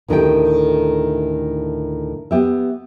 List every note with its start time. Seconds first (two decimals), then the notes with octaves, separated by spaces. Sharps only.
0.08 D2 A2 D#3 A3 G4 G5
2.31 B3 G4 E5